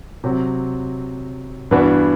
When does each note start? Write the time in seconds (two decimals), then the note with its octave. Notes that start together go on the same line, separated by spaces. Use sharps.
0.24 C3 F#3 C4
1.71 G2 E3 B3 D4 F#4